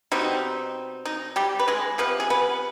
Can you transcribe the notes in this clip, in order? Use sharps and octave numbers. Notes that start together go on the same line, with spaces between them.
B2 G3 C4 D#4
D#4
G3 G4
B4
G#3 G#4
C3 F3 B3 B4
G#4
B3 B4